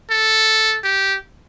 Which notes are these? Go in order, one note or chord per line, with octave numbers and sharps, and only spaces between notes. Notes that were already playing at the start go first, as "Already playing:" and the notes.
A4
G4